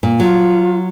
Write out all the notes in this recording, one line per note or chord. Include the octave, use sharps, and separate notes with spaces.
A#2
F#3 F4